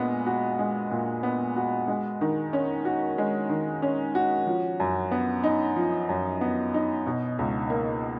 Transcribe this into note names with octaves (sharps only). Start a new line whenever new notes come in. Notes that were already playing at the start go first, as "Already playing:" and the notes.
Already playing: A#2 G#3 B3
F#4
G#3
A#2
B3
F#4
G#3
D#3
C#4
F#4
G#3
D#3
C#4
F#4
F3
F#2
B3
D#4
F3
F#2
B3
D#4
B2
C#2
A#3